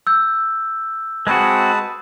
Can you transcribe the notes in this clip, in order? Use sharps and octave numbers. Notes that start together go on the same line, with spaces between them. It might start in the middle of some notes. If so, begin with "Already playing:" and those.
E6 G6
G#3 C4 F#4 G#4 B4 A5